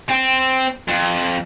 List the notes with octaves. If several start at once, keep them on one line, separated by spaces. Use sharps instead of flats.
C4
F2